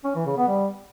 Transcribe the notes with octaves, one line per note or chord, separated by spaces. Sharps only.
C#4
E3
C#3
B3
G3